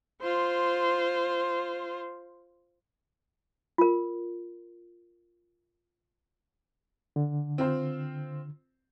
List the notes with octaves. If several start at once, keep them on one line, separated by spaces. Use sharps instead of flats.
F4 C5
F4 A#4
D3
C4 F4 C5